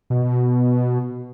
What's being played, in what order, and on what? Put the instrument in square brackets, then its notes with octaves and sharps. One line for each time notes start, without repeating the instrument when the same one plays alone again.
[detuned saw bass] B2